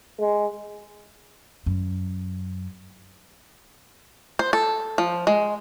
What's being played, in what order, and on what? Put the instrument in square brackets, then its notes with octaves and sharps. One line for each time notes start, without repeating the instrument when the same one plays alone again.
[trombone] G#3
[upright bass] F#2
[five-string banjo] C5
A4
F3
G#3